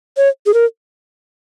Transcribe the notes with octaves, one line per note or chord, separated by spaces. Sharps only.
C#5
G#4
A#4